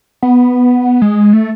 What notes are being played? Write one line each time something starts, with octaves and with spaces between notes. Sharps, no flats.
B3
G#3
A3